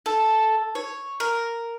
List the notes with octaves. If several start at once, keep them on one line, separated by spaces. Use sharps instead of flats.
A4
C#5
A#4